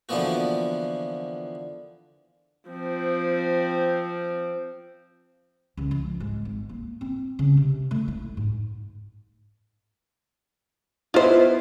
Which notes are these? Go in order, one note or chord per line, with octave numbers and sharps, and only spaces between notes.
D3 E3 F3 A#3 B3 F#4
F3 C4
C#2
F3
G#2
G#1
A#3
C4
C#3
C3
A3
E4
G#2
B3 E4 F4 C5 D#5